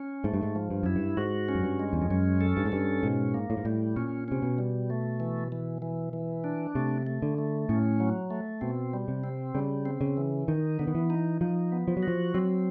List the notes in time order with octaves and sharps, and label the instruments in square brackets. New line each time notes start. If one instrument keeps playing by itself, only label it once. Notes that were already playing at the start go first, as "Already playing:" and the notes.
Already playing: [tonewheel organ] C#4
[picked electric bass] G#2 [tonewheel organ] A3
[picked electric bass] G2
G#2
[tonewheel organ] F3
[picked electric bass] G2
[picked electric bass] F#2 [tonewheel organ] E4
[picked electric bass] G2
[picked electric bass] G#2 [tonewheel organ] F#4
[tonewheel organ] C#4
[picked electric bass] F#2
G2
[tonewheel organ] G#3
[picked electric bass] E2
F2
[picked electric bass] F#2 [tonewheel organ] C#4
[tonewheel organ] A4
[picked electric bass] G2
G#2
[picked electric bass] G2 [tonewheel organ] C#4
[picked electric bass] G#2 [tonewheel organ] B2
[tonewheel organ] A#3
[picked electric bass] A2
G#2
[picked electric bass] A2 [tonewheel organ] G3
[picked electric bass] A#2 [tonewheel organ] C#4
[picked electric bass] C3 [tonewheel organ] C#4
[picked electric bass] B2
[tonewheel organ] G3
A3
E3
E3
E3
E3
D4
[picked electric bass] C3 [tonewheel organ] A3
[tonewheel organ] A3
[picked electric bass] D3
[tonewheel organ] A3
[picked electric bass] A2 [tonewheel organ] C#4
[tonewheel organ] F#3
A3
[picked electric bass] B2 [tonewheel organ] C4
[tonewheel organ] G3
[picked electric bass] C3
[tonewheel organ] C4
[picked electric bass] C#3 [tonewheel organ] G3
[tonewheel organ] C4
[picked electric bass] C#3
[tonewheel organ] E3
[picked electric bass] D#3 [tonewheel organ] D#4
[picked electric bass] D3 [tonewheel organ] B3
[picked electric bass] D#3
E3
[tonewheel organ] D#4
[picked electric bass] F3 [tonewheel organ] D#4
[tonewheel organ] B3
[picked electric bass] F3
F#3
[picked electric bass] F3 [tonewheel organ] F#4
[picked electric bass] F#3 [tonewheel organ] C4